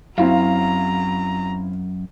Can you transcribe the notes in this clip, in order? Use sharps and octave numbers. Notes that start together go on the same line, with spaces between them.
F#2 F#3 C4 E4 F5 A#5